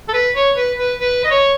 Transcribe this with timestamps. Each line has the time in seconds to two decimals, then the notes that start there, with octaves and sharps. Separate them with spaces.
0.08 A4
0.13 B4
0.35 C#5
0.56 B4
0.77 B4
0.99 B4
1.24 D#5
1.31 C#5